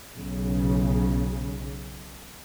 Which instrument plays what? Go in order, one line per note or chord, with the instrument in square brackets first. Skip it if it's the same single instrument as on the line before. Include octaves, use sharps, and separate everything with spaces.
[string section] B1 C#3